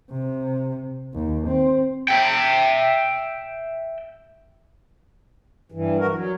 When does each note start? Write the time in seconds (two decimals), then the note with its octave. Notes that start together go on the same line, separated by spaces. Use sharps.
0.11 C3
1.15 D#2
1.48 C4
2.08 E5 G5
5.72 G2 E3
5.99 F#4 A#4
6.11 F#3